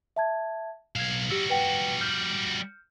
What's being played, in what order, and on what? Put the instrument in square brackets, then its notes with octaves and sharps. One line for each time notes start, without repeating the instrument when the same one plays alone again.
[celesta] E5 A5 G#6
[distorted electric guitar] B1 F5 [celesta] G#6 E7
[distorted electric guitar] G3 F#4 [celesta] G4 E6
[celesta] B4 F#5 G5
F6 G6